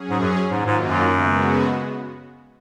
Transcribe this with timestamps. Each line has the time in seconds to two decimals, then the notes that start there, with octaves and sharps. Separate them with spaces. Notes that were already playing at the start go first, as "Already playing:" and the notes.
Already playing: F#3 C#4 G#4
0.10 G#2
0.20 F#2
0.51 G#2 D#3 F#3 A#3 F4
0.66 G#2
0.82 F#2
1.13 C#3 G#3 B3 F#4